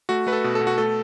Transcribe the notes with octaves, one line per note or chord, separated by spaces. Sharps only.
A3 F#4
A3 B4
A4
B2
A4
B2
F#4
A3 A4